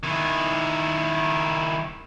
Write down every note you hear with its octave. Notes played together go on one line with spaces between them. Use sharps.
D#3 E4